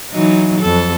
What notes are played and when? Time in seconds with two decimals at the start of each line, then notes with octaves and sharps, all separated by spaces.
0.11 E3 F#3 D#4
0.61 F2 A4